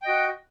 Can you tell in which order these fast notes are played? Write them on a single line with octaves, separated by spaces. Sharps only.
G5 D#5 F#4